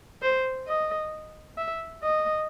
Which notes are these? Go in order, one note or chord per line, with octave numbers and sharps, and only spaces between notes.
C5
D#5
E5
D#5